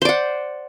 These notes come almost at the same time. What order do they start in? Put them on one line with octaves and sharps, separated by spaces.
C5 D5 F#5